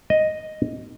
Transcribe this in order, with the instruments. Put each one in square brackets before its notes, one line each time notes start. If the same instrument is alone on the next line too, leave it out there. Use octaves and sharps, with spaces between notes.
[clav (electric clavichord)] D#5